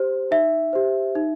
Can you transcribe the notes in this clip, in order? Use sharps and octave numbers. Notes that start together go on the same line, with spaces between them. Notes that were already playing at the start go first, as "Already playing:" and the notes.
Already playing: G4 C5
D#4 E5
G4 C5
D#4